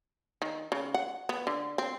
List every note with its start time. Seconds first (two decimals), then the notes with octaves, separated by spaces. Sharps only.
0.42 D#3
0.72 C#3
0.94 F#5
1.29 B3
1.47 D3
1.78 C4